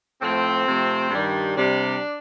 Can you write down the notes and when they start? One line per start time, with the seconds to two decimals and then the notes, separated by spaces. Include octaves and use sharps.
0.21 A2 F3 A3 C4
0.67 C3 F3 A3
1.10 G2 D#3 G3
1.56 C3 G3 D4